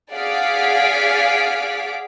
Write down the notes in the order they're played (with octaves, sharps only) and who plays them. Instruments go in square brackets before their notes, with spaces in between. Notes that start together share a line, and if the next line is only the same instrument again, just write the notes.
[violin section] G#4 D5 F5 F#5 B6 D7